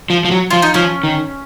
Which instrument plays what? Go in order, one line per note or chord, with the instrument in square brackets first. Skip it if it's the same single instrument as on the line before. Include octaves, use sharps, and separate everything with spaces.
[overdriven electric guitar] F3
F3
F#3
[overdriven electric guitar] F3 [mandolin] F4
[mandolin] D#4
[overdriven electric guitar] F3 [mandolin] C#4
[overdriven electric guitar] D#3